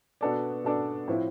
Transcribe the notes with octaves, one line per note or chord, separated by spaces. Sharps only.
B2 B3 D4 A4 D5
B2 B3 D4 A4 D5
A2 F3 C4 E4